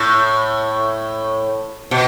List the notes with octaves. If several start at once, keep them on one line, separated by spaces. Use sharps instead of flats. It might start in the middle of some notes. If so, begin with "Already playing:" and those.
Already playing: A2
B2